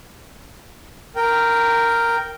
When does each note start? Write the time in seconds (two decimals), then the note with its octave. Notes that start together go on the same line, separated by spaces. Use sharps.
1.16 A#4 G5